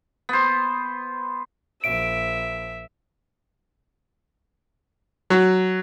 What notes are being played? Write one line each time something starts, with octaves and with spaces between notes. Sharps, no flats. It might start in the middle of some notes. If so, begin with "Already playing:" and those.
B3 C5
A#1 E5 D7
F#3